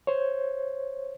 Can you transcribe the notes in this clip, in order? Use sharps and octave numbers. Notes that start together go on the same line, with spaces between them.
C5 C#5